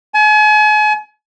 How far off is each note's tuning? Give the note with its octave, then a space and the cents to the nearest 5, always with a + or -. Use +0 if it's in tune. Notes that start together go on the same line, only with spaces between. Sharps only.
G#5 +40